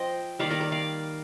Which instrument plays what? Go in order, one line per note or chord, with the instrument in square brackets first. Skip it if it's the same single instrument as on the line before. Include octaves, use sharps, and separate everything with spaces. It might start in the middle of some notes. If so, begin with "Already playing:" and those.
Already playing: [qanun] F3 C4 C5 D#5 G5
D#3 G3 A#3 D5 F5
A#4 D5
A#4 D5
D5 F5